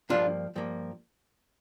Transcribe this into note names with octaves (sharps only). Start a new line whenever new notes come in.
G2 F3 A#3 D4 F4
G2 F3 A#3